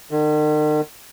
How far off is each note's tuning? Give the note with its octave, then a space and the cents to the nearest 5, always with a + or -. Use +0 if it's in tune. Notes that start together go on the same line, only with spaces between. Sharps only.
D#3 -45